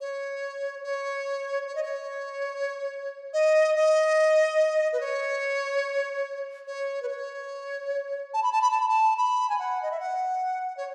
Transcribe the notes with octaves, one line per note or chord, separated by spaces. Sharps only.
C#5
C#5
C#5
D#5
C#5
D#5
D#5
B4
C#5
C#5
B4
C#5
A5
B5
A5
B5
A5
B5
A5
B5
G#5
F#5
D#5
E5
F#5
C#5